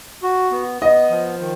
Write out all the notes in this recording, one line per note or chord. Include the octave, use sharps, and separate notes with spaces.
F#4
B3
B3 D#5
F3
D#3